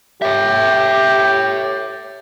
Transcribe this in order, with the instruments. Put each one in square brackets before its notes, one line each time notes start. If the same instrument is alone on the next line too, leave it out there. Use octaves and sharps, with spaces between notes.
[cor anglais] G4 [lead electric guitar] C#5 E5